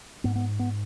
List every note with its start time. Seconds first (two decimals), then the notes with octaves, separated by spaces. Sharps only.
0.24 G#2 B3
0.36 B3
0.59 B3